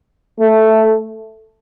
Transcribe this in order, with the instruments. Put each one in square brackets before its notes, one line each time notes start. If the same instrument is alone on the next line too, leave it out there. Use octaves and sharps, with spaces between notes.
[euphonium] A3